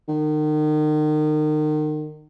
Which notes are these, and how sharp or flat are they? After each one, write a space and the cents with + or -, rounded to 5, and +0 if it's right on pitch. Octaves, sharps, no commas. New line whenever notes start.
D#3 -35